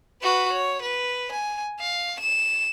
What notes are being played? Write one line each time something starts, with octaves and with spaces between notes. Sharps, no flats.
F#4 B4
C#5
B4
G#5
F5
E7